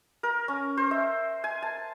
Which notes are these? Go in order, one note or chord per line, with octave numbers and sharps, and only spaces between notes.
A#4
C#4
C5
E5
G#5
A5